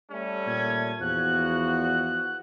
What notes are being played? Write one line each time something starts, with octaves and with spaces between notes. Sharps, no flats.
G3 A3 C#4
A#2 G#6
E2 F3 F#4 F#6